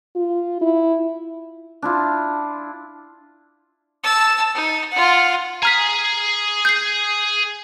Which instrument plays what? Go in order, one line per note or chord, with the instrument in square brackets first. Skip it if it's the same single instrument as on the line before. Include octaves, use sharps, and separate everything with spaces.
[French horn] F4
E4
[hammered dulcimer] D4 E4 F4
[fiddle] A5 E6
D#4
F4 F#5
[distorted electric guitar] G#4 G#5 [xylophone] A#5 F6 B6
[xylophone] G6 C7